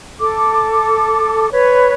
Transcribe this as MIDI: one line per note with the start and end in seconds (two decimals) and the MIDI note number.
0.19 1.48 69
0.19 1.48 86
1.52 1.93 71
1.52 1.93 73